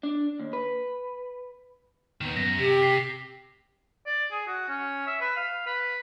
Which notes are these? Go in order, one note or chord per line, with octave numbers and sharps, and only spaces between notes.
D4
D#2
B4
D#2 D#3 B3
F#2 A#6
C3 G4 B6
B6 C7
D5
G#4
F#4
C#4
E5
B4
F5
B4